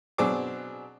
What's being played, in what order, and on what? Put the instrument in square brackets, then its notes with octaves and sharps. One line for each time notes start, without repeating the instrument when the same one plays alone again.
[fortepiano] B2 F#3 C4 D4 G#4 D6